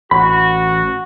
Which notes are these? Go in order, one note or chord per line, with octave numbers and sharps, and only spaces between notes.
A1 F#4 B5